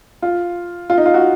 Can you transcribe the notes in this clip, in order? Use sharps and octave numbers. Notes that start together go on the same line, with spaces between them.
F4
F4
D#4
F4
F#4